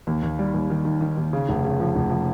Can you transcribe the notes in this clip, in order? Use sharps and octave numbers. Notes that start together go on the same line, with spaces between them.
D#2
D#2
G3
D#2
D#3
D#3
D#3
D#2
C#3
F1
C#3
F3
F1
F3